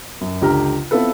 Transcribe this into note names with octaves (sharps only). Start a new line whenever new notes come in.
F#2
C#2 D3 G4 A#5 F6
B3 C4 E4 F4 A4 B4